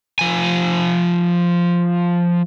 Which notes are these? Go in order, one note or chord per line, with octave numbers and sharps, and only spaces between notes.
F3 G#5